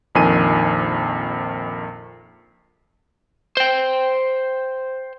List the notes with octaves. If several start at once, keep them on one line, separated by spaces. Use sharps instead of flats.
A#1 F2 D#3 G#5 D#7
C5 G5